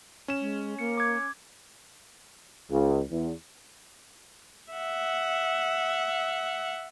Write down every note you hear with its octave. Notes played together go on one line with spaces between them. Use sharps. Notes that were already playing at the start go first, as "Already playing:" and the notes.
C#4 E7
G#3
A#3 C#7
D6 G#6
C#2
E2
E5 F#5